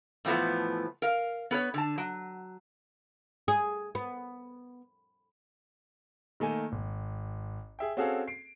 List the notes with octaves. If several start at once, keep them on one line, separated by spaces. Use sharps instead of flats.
A2 E3 F3 A3 B3
A#4 F5
B3 A#4 B4 C#5
D3 A5
F#3
G#4
B3
D#3 A3 A#3 G#5
G#1
G#4 E5 G5
C4 C#4 F#4 G#4 A4 F5
C7 D7